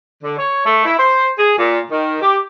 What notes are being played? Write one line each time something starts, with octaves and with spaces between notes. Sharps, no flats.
D3
C#5
A3
E4
C5
G#4
A#2
D#3
G4